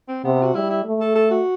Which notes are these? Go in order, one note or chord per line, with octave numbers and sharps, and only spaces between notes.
C4
C3 B3
F#4
G3 E4
E4
A3
A4
A4
F#4